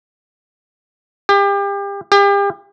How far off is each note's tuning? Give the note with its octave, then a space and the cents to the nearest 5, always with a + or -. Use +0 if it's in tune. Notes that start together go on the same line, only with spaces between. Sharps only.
G4 +30
G4 +35